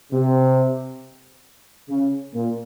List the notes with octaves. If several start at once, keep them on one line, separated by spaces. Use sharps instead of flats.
C3
C#3
A#2